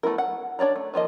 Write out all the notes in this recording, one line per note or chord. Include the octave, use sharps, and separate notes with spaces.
A3 B3 E4 A#4
F#5
D4 C#5 D5 A#5
A3
D#3 F3 A#3 D#5